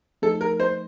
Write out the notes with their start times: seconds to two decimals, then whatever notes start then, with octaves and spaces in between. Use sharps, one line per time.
0.22 F3 A3 C4 D#4 A4
0.41 A#4
0.60 C5